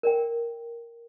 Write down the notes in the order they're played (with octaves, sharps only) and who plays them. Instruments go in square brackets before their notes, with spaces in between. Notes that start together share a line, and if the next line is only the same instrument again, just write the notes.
[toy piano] A#4 D5 G5